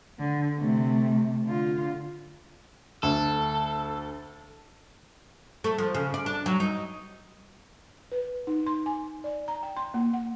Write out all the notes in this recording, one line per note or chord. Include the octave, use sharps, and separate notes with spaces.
D3
C3 A3
D3 F4
D2 A4
A3
F3
C#3
D5
D4
F#3
D#4
B4
D#4
C6
G#5
D5
A#5
G5
C6
A#3
F#5